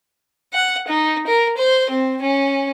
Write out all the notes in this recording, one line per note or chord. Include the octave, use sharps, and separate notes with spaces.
F#5
D#4
A#4
C5
C4
C#4